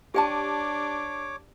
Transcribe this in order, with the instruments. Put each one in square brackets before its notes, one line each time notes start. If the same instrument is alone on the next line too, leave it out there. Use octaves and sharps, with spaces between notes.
[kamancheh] D4 [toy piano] G4 G5 A5 [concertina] C#5 D6